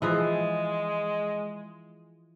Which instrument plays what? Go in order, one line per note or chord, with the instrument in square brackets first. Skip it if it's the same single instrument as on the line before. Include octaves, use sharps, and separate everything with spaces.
[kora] E3 F3 G#4 [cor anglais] G#3